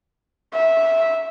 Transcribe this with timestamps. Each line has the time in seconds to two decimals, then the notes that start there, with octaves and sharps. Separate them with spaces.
0.54 E5